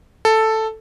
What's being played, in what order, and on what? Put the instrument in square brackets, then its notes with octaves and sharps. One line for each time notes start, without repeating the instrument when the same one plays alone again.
[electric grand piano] A4